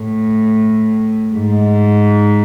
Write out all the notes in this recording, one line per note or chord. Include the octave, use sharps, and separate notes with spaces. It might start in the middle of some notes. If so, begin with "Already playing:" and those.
Already playing: A2
G#2